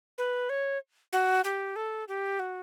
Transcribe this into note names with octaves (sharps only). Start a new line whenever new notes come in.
B4
C#5
F#4
G4
A4
G4
F#4